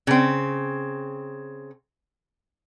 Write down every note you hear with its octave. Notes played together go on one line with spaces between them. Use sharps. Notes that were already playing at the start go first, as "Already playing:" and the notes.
C#3 C4